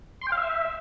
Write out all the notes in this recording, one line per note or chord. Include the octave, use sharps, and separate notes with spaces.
C6
G5
F5
E5